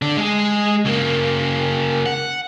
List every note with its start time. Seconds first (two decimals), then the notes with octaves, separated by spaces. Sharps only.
0.02 D3 D4
0.17 G#3 G#4
0.86 C#3 A#3
2.06 F#5